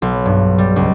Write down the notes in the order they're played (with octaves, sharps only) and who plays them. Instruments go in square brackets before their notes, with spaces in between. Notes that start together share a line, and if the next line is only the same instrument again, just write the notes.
[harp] B1
G2
G3
C#2